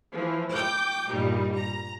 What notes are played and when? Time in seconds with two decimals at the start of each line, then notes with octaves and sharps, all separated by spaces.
0.10 E3 F3
0.51 G5 D6 G6
1.10 G2 A#2 G3 D#4
1.53 A#5